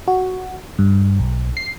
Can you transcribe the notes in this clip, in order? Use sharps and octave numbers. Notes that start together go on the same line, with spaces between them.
F#4
G2
B1
C7